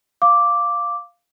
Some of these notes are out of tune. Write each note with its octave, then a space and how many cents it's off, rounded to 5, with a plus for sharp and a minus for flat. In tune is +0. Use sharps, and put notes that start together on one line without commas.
F5 +0 D6 -5